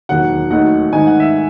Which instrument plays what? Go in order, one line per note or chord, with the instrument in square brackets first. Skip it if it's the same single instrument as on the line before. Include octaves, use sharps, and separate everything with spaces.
[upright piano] E1 D#2 D#3 F#3 F#5
D#2 D#3 F#3 A3 D#4 F#5
G#2 D#3 A3 D#4 G#5
F#5
E5